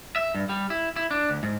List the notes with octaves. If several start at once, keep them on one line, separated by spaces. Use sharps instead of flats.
E5
G2
G3
E4
E4
D4
D2
G#2